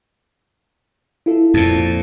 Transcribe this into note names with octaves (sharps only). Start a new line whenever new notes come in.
E4 F4 A4
F2 A#2 A5 A6